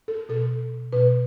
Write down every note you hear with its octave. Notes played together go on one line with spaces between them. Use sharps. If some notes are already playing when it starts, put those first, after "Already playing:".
A4
B2 A4
B2 B4